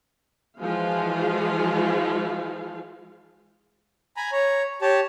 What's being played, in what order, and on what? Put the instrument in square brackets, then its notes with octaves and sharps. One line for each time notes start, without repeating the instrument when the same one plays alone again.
[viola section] E3 F3 G#3 F4 F#4 F5
[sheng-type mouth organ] G#5 A#5 B5
C#5 A#5
G4 C#5 A5